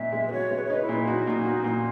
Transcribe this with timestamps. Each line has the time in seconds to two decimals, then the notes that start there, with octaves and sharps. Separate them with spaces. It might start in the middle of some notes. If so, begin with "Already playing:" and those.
Already playing: A#2 D#4 E5
0.13 G#3
0.27 B4
0.31 F#4 C#5
0.51 G#3
0.56 B4
0.64 C#5
0.70 D#4 B4
0.82 E4
0.89 A#2
1.07 D#4 F#4
1.27 A#2
1.45 F#4
1.64 A#2